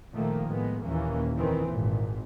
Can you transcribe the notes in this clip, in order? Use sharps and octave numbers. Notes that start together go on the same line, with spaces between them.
A#2 D#3 F3 A3 A#3
A2 G#3 B3
D#2 A#2 E3 A#3 C#4
F2 D#3 E3 C4
G#1 A#2